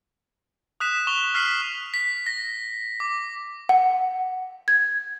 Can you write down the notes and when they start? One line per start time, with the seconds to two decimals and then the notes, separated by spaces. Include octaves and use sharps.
0.80 D#6 F#6 B6 E7
1.07 C#6 E7 F7 G7
1.35 F6 B6 C7 F#7
1.94 B6
2.26 A#6
3.00 D6
3.69 F#5
4.68 G#6